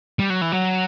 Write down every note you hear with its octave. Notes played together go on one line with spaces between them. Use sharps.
G3
F#3
E3
F#3